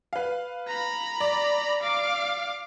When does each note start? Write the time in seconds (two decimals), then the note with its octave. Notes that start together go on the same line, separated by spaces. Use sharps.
0.13 B4 F5
0.68 A#5 B5
1.20 D5
1.82 F5 D6